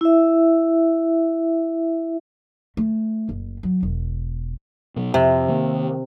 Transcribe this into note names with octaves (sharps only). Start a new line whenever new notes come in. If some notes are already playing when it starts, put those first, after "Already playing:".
E4 E5
A3
F#1
F#3
E1
B2 F#3
F2 C3
D#3 A#3